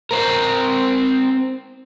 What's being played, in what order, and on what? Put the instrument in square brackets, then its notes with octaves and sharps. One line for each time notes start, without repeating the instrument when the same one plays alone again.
[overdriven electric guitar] C4 A#4